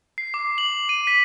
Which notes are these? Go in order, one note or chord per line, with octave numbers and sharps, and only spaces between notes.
C7
D6
F#7
D#7
B6